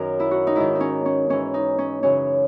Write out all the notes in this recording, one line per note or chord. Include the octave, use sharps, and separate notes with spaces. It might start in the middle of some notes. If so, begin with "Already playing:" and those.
Already playing: F#2 D#3 A#4
E4
F#4
D#4
G#2 D#3 E4
D#4
C#4
C#4
G#2 E3 C#4
D#4
C#4
F#2 C#3 E3 C#4